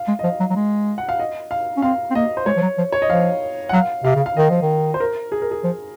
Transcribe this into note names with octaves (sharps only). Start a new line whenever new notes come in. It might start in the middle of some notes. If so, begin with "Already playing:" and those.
Already playing: F5
G#3
D#5
F3 F5
F#3
F#3
G#3
F#5
F5
D#5
F5
C#4
C4 F5
C4
A#3 D#5
C5
G#3 C#5
F3
F#3
F3
C#5
D#5
F3 F5
F#5
F#3 F5
C3 F5
C#3
F5
D#3 D#5
F3
D#3
C5
A#4
G#4
A#4
G#4
F3